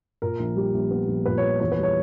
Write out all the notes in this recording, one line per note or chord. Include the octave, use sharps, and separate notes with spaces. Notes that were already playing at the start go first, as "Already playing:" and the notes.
A#2 A#4
A#1
G3
A#1
B3
A#1
A#2 B4
C#5
B3
E2 C#5
B4
G3 C#5